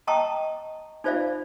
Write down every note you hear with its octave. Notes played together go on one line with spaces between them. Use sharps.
D#5 G5 A5 A#5 C#6 D#6
D#4 F4 C5 D5 E5 F5